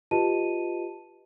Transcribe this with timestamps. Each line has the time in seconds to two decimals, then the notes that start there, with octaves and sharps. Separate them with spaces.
0.11 F4 G4 B4 D#5 A5 D#7